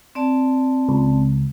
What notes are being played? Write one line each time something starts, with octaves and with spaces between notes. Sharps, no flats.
C4 D5 A5
C#2